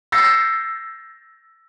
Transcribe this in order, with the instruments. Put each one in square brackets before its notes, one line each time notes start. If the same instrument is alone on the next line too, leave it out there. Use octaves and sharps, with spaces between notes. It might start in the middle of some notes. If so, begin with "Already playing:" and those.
[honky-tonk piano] E6 G6 A6 A#6 C7 C#7